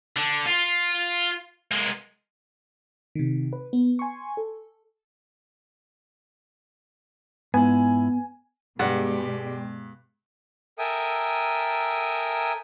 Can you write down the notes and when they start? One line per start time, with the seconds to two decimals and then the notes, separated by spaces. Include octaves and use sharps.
0.16 D3
0.46 F4
1.71 G#3 A#3
3.15 C3 D#3
3.53 B4
3.73 B3
3.99 G#5 C6 C#6
4.37 A4
7.54 G#2 B3 E4 G#5
8.79 G2 B2 G#3 G4 G#4 D5 F#5
10.79 A4 A#4 E5 G5 G#5 D#6